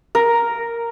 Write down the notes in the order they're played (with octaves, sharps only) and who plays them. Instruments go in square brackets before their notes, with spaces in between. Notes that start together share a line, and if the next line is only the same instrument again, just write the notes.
[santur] A#4